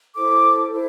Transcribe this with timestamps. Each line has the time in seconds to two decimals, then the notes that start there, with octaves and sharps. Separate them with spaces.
0.16 E4 A4 C5 D6
0.70 E4 A4 C5